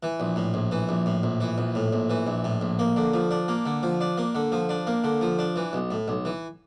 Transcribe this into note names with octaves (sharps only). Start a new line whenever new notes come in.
E3
A#1
A2
A#1
E3
A#1
A2
A#1
E3
A#1
A2
A#1
E3
A#1
A2
A#1
A#3
D3
F3
D4
A#3
D3
F3
D4
A#3
D3
F3
D4
A#3
D3
F3
D4
E3
B1
A2
B1
E3